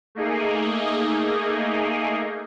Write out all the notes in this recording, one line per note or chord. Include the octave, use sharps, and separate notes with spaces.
A3 A#3 D#4 G#4